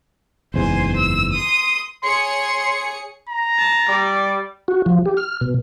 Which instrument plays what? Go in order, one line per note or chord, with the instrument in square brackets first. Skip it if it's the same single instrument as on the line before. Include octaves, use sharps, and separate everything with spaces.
[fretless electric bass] F#1 E2 G#2 [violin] C5 G#5
[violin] E6
C6 D#6
[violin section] G#4 C#5 C#7 [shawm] C6
[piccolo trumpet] A#5
[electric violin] A5
[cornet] G3 [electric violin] D5
[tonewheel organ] F#4
F3
G4
F6
B2